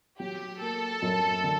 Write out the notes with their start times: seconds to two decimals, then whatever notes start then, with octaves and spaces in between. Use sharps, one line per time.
0.20 F#3 G4
0.60 A#3 A4
1.02 F#2
1.44 D3